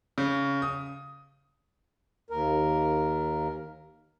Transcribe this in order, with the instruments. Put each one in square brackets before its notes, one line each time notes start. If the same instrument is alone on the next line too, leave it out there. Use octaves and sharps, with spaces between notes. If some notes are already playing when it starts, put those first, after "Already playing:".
[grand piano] C#3
D#6
[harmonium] D#2 A#4